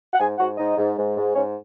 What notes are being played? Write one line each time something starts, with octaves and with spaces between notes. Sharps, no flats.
F#5
G#2 G#4 G#5
G#2 F#4 F#5
G#2 D#4 D#5
G#2
G#2
G#2
G#2 C#4 C#5